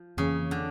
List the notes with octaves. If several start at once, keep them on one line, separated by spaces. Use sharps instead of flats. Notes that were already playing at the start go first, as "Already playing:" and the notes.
Already playing: F3
F2 C#3 E3 A#3
D3